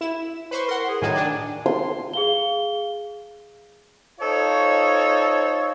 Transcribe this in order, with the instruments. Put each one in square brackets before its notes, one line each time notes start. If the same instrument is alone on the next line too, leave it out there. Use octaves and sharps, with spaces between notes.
[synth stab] E4 E7
B4 C5 C#6
[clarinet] A#4 [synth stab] F#5 C6
[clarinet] G#4
[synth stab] A2 D#3 F#3 [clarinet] G#5
[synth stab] D4 D5
[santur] C6
[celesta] G#4 F5 G7
[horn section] D#4 F4 A4 C5 C#5 D#5